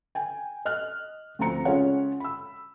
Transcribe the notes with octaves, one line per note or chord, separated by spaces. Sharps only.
G5 G#5
D#5 F6 F#6
D2 F3 C4 A#5 C#7
C#3 G#3 C#4 F4 C#5 F#5
B5 E6